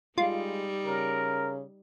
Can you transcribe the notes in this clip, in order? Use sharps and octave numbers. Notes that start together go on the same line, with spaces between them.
G3 G#3 D#4 F4
C#3 A#4